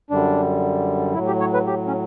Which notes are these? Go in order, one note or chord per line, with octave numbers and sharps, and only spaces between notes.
F#2 D3 G3 D4
A2 F#3 E4
G4
C#5
B4
G4
C#4